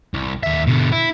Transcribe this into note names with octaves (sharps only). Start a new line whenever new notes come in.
C2
D#2 E5
B2 D3
E4